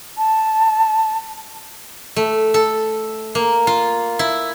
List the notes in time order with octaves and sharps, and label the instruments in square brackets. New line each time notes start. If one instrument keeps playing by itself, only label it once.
[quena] A5
[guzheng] A3
A4
A#3
F4
E4